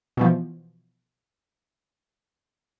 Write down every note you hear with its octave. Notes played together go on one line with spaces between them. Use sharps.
B2 E3 F3